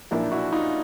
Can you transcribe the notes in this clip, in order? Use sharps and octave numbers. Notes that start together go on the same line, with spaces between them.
B1 A#2 F3 A#3 D4 E4
E4 F#4
D#4 F4